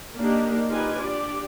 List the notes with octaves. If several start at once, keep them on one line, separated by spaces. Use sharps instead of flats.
A#3 D4 D#4 G4
D#4 F4 G4 B4 G#5
D4 G4 D5